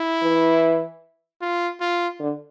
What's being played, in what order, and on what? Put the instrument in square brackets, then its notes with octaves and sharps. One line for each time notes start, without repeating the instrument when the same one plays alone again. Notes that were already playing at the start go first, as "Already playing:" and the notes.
Already playing: [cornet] E4
[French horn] E3
[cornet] F4
F4
[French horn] D3